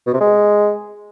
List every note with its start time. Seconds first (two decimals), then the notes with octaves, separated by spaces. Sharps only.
0.07 B2
0.13 C3
0.20 G#3